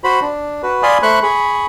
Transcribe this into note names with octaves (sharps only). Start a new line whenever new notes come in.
F#4 C5 B5
D4
F#4 B4
D5 F5 G#5 B5 C6 D#6
A3 C5 B5 C#6 F#6
G#4 B5 C#6